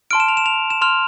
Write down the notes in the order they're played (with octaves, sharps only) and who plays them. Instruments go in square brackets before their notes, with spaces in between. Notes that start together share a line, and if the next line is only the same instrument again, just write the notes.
[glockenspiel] A5 C6 F6 D7
E7
F7
E7
F7
E7
C6 F6 F7